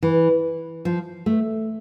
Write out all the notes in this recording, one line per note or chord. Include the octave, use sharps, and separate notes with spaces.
E3
F3
A3